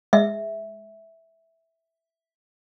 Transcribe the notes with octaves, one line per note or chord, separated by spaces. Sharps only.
G#3 E5